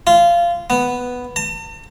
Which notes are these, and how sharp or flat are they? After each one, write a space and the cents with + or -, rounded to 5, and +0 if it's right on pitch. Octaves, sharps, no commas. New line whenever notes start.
F4 -20
B3 +0
A5 +45